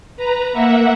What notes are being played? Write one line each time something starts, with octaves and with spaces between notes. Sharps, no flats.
B4 A#5
A#3 E5 F#5